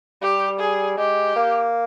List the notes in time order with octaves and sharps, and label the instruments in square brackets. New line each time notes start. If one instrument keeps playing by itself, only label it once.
[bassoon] G3 [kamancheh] G4
[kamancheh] G#4
[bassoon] G#3 [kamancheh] G4
[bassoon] A#3